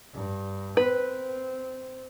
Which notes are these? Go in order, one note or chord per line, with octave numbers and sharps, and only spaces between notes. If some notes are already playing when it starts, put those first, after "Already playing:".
G2
C4 B4